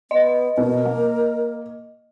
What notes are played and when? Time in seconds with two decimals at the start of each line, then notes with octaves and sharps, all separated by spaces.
0.11 B3 D#5
0.58 B2 A#4
0.85 A#3